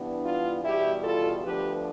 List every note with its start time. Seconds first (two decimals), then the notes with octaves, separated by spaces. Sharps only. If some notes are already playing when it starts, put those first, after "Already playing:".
Already playing: G2 E3 B3 D4
0.25 F4
0.64 E2 B2 G3 E4 G4
1.03 F4 A4
1.43 D2 D3 F3 B3 D4 G4 B4